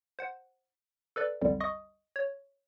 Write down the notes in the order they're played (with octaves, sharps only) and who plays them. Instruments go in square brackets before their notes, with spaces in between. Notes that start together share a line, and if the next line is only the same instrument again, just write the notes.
[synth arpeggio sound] C5 F#5
A4 B4 D5
B1 F2 D3 G3
D#5 C#6 D#6
C#5